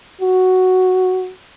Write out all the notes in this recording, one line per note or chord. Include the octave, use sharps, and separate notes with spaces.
F#4